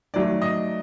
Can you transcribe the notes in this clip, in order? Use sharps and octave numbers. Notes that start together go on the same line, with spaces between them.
D#3 F#3 A3 D5
D#5